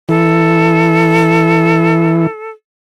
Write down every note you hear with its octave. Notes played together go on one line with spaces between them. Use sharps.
E3 A4